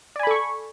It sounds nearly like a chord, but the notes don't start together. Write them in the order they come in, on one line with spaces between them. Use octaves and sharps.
D5 G#5 B5 A4 C#6